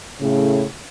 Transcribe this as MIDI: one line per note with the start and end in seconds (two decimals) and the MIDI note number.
0.21 0.63 45
0.21 0.63 49